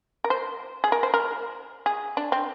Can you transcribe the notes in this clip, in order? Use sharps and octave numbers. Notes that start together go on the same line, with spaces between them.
A#4
C5
G#4
A#4
C5
A#4
G#4
D4
C4